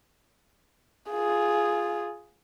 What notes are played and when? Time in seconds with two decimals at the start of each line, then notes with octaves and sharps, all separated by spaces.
1.10 F4 G#4